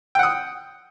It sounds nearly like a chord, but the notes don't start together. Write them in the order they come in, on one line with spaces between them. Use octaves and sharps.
G5 F#5 D#6